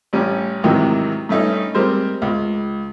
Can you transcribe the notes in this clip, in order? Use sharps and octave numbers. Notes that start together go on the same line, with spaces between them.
A1 G3 C#4
G#2 C3 D#3 E3 F#3
G2 A3 C#4 D#4
G3 G#3 C4 A#4 C5
C#2